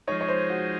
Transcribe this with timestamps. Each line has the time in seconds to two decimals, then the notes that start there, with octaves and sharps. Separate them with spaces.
0.07 F3 G#3 D#4 C#5
0.21 C#5
0.28 C5
0.50 F#4